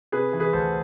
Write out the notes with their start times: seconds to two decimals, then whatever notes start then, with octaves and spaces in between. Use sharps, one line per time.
0.12 C3 G#4 B4
0.33 E3
0.40 G#4 B4
0.53 D2 A4 C5